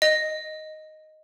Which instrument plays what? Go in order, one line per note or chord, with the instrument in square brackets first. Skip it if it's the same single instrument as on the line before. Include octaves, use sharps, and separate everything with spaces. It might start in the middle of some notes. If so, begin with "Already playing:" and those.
[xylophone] D#5